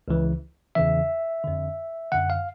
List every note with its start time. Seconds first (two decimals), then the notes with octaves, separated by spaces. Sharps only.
0.08 C#2 C#3 E3
0.75 E2 C#3 E3 E5
1.44 F2 D3
2.12 F#2 D3 F#5
2.30 F5